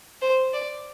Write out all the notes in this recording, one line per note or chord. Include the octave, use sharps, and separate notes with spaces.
C5
D5